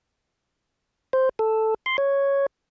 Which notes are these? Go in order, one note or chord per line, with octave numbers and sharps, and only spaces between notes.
C5
A4
C6
C#5